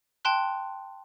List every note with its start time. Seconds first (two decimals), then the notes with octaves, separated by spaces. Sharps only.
0.25 G5 A5 C6 F#6